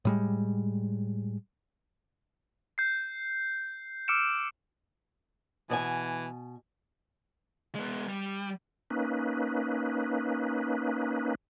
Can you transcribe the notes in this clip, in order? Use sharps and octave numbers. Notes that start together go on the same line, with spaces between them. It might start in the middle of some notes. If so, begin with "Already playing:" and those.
A2 G3 G#3
G6 C7
D6 E6 F6 C#7 D7 E7
B2 E3 D5 G#5
G#3 B3
G3
A#3 C#4 D#4 B4